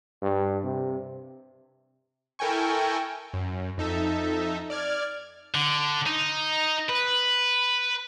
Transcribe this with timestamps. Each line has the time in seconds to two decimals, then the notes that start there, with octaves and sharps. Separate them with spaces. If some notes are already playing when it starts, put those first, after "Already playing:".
0.22 G2
0.64 C3
2.39 E4 A4 A#4 G5 G#5 C#6
3.34 F#2
3.78 F2 D#4 A4 E5
4.70 D5 F6 G#6
5.54 D3
6.06 D#4
6.89 B4